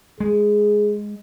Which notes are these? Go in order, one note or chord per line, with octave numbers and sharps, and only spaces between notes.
G#3 G#4